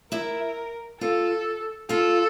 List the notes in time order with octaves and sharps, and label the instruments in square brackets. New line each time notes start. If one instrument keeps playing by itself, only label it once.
[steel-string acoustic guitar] E4 E5 [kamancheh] A#4
[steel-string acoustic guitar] F4 F5 [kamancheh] A4
[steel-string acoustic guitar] F4 F5 [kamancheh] A4